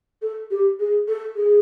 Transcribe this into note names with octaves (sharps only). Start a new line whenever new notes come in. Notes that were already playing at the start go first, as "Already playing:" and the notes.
A4
G4
G#4
A4
G#4